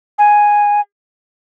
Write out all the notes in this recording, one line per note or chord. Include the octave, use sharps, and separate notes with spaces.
G#5